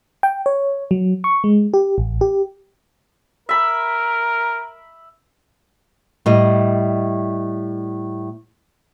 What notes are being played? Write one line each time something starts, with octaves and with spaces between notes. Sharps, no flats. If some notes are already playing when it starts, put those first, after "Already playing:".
G5
C#5
F#3
C#6
G#3
G4
A1
G4
A#4 E5 B5
A2 G3 D#5